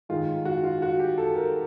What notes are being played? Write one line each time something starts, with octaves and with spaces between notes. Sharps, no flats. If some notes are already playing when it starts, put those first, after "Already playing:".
G#2 D#3 G#3 F4
F#4
F4
F#4
G4
A4
A#4